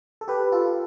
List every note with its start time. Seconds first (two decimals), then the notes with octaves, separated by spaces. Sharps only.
0.21 A4
0.28 G4 B4
0.52 F4 A4